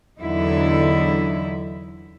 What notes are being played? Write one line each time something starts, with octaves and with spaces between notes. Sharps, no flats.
E2 D3 F#3 D#4 E4